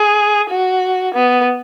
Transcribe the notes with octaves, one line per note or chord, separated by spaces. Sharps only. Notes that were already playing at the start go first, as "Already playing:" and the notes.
Already playing: G#4
F#4
B3